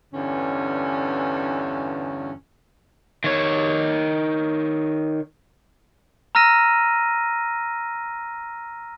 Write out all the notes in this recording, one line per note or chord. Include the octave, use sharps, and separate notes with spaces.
E2 G2 D3 C#4
D#3 C#5
A#5 E6 F6 A#6 D#7